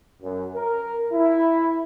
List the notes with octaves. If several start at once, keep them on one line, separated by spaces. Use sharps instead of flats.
F#2
A#4
E4